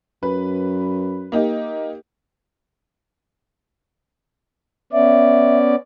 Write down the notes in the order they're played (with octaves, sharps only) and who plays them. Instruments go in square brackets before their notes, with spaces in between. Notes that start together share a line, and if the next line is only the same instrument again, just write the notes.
[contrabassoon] F#2 [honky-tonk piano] B4
[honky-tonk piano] A#3 D#4 G4
[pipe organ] B3 C#4 D5 [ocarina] E5